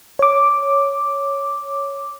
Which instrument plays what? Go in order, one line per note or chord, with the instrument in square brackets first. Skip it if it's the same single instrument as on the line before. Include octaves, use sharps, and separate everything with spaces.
[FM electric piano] C#5 D6